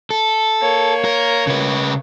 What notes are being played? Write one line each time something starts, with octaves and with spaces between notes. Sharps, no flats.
A4
A#3 C#5
A#4
C#3 B4